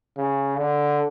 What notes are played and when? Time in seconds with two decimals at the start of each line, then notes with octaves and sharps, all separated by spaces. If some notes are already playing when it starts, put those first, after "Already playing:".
0.18 C#3
0.58 D3